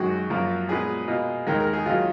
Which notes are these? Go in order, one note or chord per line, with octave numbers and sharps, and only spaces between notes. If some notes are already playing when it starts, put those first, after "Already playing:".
Already playing: F#2 D#3 G#3 F#4
F#2 F3 A#3
A#2 G#3 B3 G#4
B2 A#3
D#2 D#3 G#3 A#4
A#4
G#4
D#2 D#3 F#3 A#3 F4